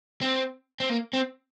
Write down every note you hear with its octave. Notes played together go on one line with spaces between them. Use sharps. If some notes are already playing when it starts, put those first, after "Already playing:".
C4
C4
A#3
C4